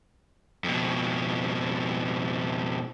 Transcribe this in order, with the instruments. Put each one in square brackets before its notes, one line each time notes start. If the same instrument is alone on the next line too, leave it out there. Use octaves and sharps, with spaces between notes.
[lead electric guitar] F2 B2